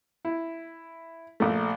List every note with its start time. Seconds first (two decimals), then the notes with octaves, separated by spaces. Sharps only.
0.25 E4
1.40 A#1 A3